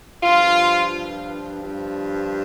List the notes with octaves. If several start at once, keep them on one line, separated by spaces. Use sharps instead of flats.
G2 F3 F4
G2 F3